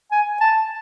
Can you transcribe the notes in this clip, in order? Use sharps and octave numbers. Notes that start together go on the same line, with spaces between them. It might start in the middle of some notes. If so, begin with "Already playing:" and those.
G#5
A5